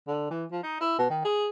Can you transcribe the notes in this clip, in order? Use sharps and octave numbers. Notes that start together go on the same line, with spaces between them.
D3
E3
F3
D#4
E4
B2
D#3
G#4